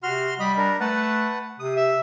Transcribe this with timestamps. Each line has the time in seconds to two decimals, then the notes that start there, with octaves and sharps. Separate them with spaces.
0.03 C3 F#4 C6 F6
0.40 G3 D#5 B5
0.57 D4 A#4
0.80 A3 B4 F#5 A5
1.59 C3 D#6
1.76 E5